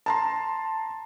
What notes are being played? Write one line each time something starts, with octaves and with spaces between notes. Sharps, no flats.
A5 A#5 C6